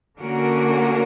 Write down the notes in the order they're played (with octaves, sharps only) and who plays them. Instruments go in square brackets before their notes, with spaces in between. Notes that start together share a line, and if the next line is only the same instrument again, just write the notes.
[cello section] D3 A#3 C#4 F#4 A#4